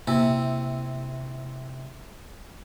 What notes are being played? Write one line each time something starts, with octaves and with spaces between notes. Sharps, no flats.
C3 A#3 E4